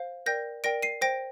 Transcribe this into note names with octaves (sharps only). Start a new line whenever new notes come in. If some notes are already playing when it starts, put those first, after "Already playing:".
Already playing: C5 F5
A#4 D5 G5 G6 A#6
A#4 D5 G5 A#6 D7
C7 D#7
C5 G5 A#6 D7